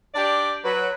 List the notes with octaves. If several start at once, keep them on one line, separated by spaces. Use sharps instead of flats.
D4 G4 D5
F#3 B4